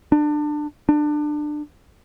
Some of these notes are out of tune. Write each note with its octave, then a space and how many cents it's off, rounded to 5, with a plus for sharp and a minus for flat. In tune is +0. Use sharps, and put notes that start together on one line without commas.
D4 +25
D4 +25